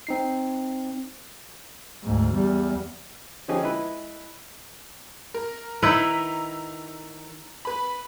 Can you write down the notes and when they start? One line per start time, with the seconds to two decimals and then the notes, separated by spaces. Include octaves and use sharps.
0.07 C4 D#4 C7
2.03 D2 G#2
2.33 E2 G3
3.48 D3 F3 C#4 D#4 G4 G#4
3.63 G#3 E4 B4
5.34 A#4
5.82 D#3 D#4 E4 B4 A#5 E6 B6
7.65 B4 B5